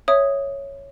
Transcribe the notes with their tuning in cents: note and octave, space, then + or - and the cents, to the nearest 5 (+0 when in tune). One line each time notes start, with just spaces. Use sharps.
C#5 +0 E5 +0 D#6 +0